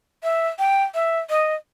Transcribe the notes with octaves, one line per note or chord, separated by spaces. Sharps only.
E5
G5
E5
D#5